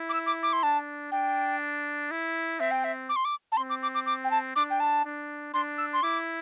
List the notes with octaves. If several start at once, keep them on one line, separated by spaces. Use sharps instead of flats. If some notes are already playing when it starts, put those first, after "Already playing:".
Already playing: E4
D6
E6
D6
D6
C6
D4 A5
D4 G5
E4
C4 E5
G5
E5
D6
C6
D6
A5
C4 C6
D6
D6
D6
D6
G5
A5
D4 D6
G5
A5
D4
D4 C6
E6
C6
E4 D6